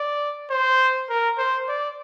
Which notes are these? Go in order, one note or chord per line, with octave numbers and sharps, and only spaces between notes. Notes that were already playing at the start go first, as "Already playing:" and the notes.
Already playing: D5
C5
A#4
C5
D5